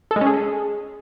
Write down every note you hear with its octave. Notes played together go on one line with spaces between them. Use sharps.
A4
G#3
C#4
G#4